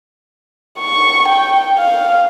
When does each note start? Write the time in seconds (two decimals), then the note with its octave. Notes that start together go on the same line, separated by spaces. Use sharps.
0.79 C#6
1.28 G5
1.79 F5